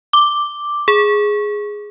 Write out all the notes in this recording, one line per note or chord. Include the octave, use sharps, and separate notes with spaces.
D6
G#4